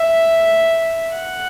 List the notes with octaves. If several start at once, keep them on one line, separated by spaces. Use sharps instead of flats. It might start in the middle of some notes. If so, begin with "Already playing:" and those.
Already playing: E5
F#5